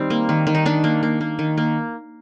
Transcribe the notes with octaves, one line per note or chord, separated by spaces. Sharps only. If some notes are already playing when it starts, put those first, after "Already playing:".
Already playing: D#3 G3 C4 D#4
A#3
D#3
D#3
D#4
D#3 D4
A#3
A#3
A#3
D#3
A#3